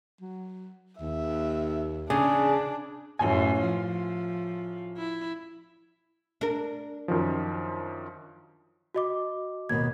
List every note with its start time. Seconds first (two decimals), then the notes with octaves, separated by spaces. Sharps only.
0.21 F#3
1.01 D#2 E5
2.10 C#3 D4 G#4 D5 G#5
3.19 A1 F#2 G#5
3.61 F3
4.97 E4
6.41 D4 A#4
7.08 F#2 D#3 F3
8.94 F#4 D#5 D6
9.69 D#2 B2 G#6